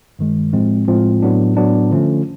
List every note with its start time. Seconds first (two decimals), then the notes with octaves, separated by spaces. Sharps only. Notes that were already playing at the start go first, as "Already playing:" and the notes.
0.19 G2 D#3 G#3
0.53 A2 F3 G#3 C4
0.88 A2 F3 G#3 C4
1.22 A2 F#3 B3 D4
1.57 A2 F#3 B3 D4
1.91 D3 F3 A3 C#4